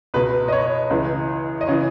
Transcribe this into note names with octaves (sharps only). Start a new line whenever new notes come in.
C#2 B2 B4
D#5
C#5
C#2 C#3 E3
D#5
C#3 E3 C#5